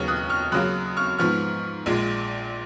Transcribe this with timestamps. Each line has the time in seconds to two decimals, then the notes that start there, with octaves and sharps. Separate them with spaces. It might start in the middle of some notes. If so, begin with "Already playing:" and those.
Already playing: D#2 C#3 F#3 B3 C#6 F6
0.08 D#6 F#6
0.30 C#6 F6
0.52 F#2 C#3 F#3 A#3 D#6 F#6
0.97 C#6 F6
1.18 G#2 F3 B3 C#6 F6
1.86 A#1 A#2 G#3